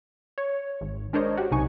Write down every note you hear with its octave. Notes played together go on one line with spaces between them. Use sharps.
C#5
G#1
G#3 D4 A#4 C5 C#5 D#5
F#4 G4
B1 C3 D#4 G#5 C#6